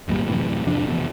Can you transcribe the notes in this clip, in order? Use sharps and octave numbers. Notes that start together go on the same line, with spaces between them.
G#1 F2 A#2 G3
F#2 A2 C3 E3
F2 C3 F3 D4
F1 E2 B2